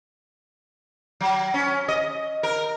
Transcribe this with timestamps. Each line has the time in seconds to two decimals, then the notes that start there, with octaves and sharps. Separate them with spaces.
1.21 F#3
1.54 C#4
1.88 D#5
2.43 A#4